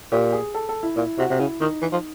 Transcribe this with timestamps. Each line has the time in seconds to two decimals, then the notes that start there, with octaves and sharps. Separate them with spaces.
0.12 A#2 G4
0.33 G#4
0.54 A4
0.69 A4
0.83 E4
0.97 A#2 E4
1.18 C3 F#4
1.30 C3
1.39 C#3 E4
1.61 D#3 D#4
1.82 E3
1.92 F3